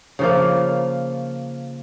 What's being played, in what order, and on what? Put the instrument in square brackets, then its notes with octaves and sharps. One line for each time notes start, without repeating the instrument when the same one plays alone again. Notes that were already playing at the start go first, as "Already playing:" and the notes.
[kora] C#3 F3 A#3